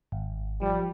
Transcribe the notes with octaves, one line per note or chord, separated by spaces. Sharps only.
G#1
F3 G3